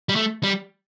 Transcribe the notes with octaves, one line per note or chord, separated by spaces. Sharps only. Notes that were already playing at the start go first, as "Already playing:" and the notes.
G3
A3
G3